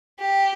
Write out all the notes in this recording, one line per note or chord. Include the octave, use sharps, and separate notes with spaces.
G4